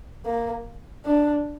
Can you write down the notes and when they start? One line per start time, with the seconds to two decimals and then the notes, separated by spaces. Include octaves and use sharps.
0.25 A#3
1.05 D4